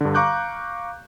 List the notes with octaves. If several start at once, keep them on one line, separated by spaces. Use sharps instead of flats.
G2 D3
F5 A#5 C#6 D6 F#6 G6